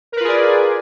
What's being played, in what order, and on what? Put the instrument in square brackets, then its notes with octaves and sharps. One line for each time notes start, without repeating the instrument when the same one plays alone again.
[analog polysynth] A#4
B4
F4
G#4
D5